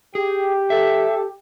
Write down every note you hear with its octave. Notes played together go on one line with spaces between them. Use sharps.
G4 G#4
A4 E5